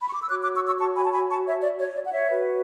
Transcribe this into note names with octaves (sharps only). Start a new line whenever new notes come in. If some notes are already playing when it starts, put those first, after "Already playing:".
B5
C#6
D6
E6
F#4 C#5 D6 F#6
D6 F#6
C#6 E6
C#6 E6
A5 C#6
G#5 B5
A5
G#5 B5
A5 C#6
C#5 E5
D5
C#5
D5
F#5
C#5 E5
F#4 B4